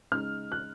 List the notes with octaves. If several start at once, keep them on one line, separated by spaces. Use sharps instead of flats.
C#3 G#3 D#4 F6
F#6